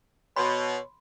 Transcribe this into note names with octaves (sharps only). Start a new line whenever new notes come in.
B2 C#5 B5 C6